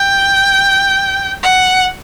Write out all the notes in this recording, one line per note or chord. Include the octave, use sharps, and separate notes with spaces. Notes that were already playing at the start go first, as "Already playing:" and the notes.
Already playing: G5
F#5